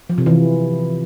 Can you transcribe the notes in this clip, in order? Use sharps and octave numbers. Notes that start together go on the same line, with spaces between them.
F3
C3
E3